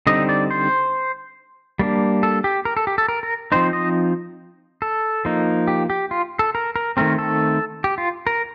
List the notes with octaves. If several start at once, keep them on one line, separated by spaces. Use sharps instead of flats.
D3 G3 C4 D#4 D#5
D5
C5
G3 A#3 D4
A4
G4
A#4
A4
G4
A4
A#4
A#4
F3 C4 D#4 C5
D#5
A4
F3 A#3 D#4
G4
G4
F4
A4
A#4
A#4
D#3 A3 C4 A#4
A4
G4
F4
A#4